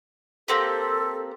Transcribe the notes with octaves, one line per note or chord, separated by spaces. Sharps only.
A#3 C4 G4 A4